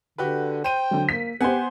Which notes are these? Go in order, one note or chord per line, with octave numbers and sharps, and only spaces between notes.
D3 F#4 G4 B4
C5 G5 D#7
D3 F#3
A#3 B6
B3 G4 C5 F#5 G#5